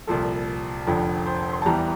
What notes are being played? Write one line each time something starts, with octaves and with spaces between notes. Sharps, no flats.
C2 A#2 F3 A4
F1 F2 D3 F3
C5
C6
A5
E2 E3 G3 A#5